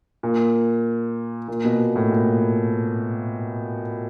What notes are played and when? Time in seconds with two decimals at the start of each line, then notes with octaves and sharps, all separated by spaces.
0.23 A#2
1.48 A#2
1.65 B2
1.96 A2
2.11 A#2